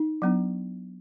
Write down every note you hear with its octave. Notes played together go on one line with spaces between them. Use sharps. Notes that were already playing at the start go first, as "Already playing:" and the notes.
Already playing: D#4
F#3 B3 D4